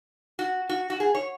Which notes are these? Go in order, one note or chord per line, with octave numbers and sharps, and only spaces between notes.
F#4
F#4
F#4
G#4
C#5